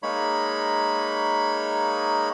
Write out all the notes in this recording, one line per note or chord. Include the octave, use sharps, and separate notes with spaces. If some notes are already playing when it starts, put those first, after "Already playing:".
G#3 A#3 D#4 C#5 B5